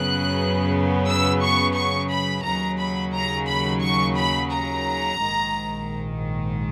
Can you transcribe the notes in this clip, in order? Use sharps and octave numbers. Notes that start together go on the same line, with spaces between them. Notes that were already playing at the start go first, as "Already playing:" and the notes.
Already playing: F#2 C#3 F#3 B3 F#6
E6
C#6
C#6
B5
D#2 C#3 F#3 A#5
B5
A#5
B5
C#6
B5
A#5
A#1 G#2 D#3